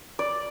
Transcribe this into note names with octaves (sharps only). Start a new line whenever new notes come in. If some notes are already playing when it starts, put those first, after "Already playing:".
D5